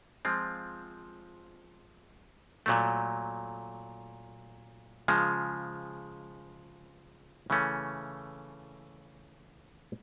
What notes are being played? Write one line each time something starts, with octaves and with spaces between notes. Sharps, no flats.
F3 G#3 C4 F4
A#2 F#3 A3
C#3 F3 G#3
C#3 E3 A3 C#4